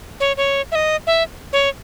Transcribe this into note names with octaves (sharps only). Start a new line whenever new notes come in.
C#5
C#5
E5
D#5
E5
C#5